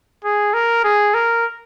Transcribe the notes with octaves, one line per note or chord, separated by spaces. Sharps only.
G#4
A#4
G#4
A#4